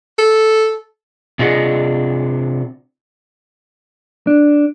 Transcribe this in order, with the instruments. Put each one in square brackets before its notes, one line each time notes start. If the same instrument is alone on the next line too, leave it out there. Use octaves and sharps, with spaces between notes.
[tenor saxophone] A4
[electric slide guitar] C3 D4 F4 G#4 D#5 F#5
[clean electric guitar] D4